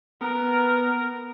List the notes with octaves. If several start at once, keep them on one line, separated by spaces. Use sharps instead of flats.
B3 A#4